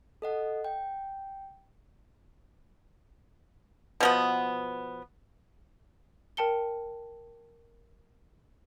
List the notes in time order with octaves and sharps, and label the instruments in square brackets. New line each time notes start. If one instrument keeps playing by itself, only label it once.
[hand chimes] A4 D#5 F#5
G5
[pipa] B2 F3 B3
[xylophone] A#4 G5 A5 C#7 G7